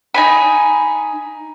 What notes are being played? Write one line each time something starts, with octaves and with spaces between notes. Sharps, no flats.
D#4 G#5 B5